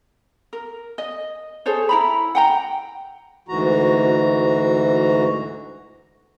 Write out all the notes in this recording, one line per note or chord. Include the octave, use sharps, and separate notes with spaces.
A#4
D#5
G#4 A4 C5 C#5
E4 A#5 B5
F#5 G5 A#5
D2 G#2 E3 F#4 A#5